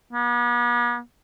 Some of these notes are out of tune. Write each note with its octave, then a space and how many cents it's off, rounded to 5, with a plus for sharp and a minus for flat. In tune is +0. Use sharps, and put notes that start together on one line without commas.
B3 -45